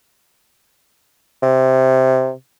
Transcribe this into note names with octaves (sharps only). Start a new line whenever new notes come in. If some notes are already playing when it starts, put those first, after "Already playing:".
C3